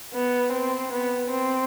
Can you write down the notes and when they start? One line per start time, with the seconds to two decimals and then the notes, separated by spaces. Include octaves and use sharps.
0.14 B3
0.52 C4
0.92 B3
1.31 C4